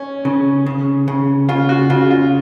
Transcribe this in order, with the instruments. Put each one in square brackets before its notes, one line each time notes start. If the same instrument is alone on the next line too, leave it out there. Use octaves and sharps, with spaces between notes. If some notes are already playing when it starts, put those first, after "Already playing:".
Already playing: [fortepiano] C#4
[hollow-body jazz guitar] C#3
C#3
C#3
[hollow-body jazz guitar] C#3 [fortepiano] F4
[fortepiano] F#4
[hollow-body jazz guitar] C#3 [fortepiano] F4
[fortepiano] F4